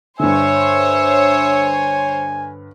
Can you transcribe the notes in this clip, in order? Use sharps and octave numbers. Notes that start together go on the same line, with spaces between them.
G2 D3 C5 C#5 E5 G#5